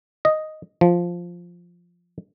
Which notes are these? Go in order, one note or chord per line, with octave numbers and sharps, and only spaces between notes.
D#5
F3